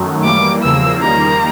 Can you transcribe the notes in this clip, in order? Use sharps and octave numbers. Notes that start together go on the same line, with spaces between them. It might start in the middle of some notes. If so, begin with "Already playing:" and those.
Already playing: F#2 D#3 F#3 A3
E3 G3 A#3 D6
E2 C#3 F3 A#3 E6
D#3 G3 A#3 A#5